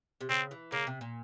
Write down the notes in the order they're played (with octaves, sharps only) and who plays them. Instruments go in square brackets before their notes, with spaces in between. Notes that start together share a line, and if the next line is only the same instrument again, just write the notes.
[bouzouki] C3
[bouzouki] C#3 [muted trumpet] C4
[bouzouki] E3
[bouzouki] C#3 [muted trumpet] A#3
[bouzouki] C3
A#2